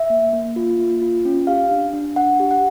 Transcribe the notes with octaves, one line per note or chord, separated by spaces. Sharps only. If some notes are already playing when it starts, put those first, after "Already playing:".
Already playing: E5
A#3
A#3
F4
A#3
F4
C#4
G4 F5
D4
D4
D4 F#5
G4
F#5